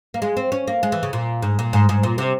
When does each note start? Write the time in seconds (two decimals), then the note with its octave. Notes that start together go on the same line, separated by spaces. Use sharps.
0.14 A#3
0.22 G#3
0.37 C4
0.52 C#4
0.67 A#3
0.83 G#3
0.92 E3
1.03 C#3
1.13 A#2
1.42 G#2
1.59 A#2
1.73 G#2
1.89 G#2
2.03 A#2
2.18 C3